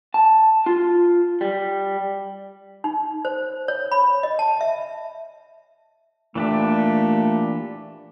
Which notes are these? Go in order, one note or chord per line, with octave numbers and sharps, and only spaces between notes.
A5
F4
G3
D#4
C5
C#5
B5
D#5
A5
E5
A#2 E3 A3 D4 G4